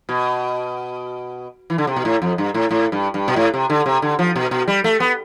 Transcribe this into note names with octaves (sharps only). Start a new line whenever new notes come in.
B2
E3
D3
C3
B2
A2
F2
G2
A2
A2
G2
G2
B2
A2
C3
D3
C3
D3
F3
B2
B2
G3
A3
B3